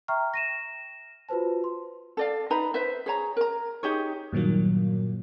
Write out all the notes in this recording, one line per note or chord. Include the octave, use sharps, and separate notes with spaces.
E5 G5 A#5 C#6 F6
A#6 D#7 E7
F4 F#4 B4 C5 A5
C6
A4 D5 F5
D#4 B4 A#5 B5
B4 C5 E5
G#4 C#5 A#5
A#4 A#5
D#4 G4 G#4 C#5
G2 A#2 D#3 F#3 A#3